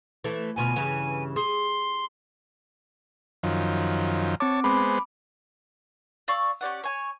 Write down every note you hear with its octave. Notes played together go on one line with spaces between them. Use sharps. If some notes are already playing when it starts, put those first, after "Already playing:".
E3 A3
D2 B2 F4 G#5
G2 C#3 E3
G#4 C6
F#2 D#3 F3
C4 C#5 A5 D6
G#3 B3 C5 B5 D6
D5 F5 C#6 E6
C#4 G4 D5 F#5
C#5 G#5